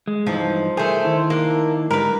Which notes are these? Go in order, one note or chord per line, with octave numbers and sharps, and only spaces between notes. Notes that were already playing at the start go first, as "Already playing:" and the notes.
G#3
G2 E3 F3 D#4
A3 G#4 A#4 C5 G#5
D#3 E4
A#3 D4
G#2 D3 G3 A#4 B4